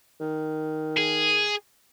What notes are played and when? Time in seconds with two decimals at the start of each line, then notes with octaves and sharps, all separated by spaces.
0.20 D#3
0.97 G#4